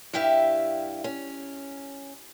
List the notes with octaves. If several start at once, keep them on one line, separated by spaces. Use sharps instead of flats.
G2 E4 G4 E5 F5
C#4